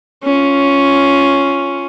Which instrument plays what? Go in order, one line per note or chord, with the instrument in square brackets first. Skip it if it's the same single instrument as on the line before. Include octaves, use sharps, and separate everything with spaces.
[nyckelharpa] C#4 F4